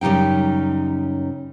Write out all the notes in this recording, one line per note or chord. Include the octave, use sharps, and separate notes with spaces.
F#2 C#3 G3 D#4 G5